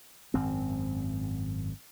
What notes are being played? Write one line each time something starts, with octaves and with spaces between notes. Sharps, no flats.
G#1 F#2 C4